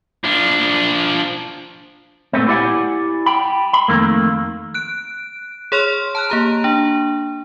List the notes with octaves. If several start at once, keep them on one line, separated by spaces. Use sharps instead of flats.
F3 D4
A#2 A3 B3 C4
E4 G4 D5 D#5 F#5 G#5
G5 B5
B5
F2 A#2 D#3 A3 A#3
F#6 D7
G#4 C#5 C6 F6
A5 F6 F#6
A#3 G4 A#5
D4